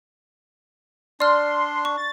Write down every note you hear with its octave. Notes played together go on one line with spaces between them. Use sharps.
D4 D5 C6 F6
C#6
A6